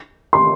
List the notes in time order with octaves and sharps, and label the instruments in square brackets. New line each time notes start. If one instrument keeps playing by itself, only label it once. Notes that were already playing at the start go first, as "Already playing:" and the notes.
[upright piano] C6